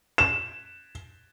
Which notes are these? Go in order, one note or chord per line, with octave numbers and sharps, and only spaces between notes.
E7